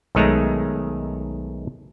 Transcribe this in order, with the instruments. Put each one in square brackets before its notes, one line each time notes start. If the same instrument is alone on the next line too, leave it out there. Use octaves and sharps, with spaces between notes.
[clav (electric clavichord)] B1 D#3 G#3 A3 A#5